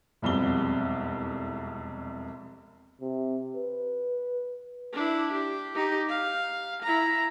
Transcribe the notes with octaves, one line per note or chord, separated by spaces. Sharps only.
E1 C2 F2 G7
C3
B4
D4 E4
G4
D#4 G4
F5
E4 A#5